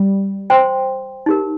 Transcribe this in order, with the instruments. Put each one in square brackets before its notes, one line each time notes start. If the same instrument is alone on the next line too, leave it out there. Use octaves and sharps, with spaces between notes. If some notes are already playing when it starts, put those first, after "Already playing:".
Already playing: [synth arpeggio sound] G3
[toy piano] C5 G5 C6
D#4 G4 A#4